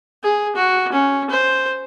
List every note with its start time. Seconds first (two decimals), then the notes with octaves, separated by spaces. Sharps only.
0.23 G#4
0.56 F#4
0.92 C#4
1.31 C5